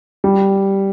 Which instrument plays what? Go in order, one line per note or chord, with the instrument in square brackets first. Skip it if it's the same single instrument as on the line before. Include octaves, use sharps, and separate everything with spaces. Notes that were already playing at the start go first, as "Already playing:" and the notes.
[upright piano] G3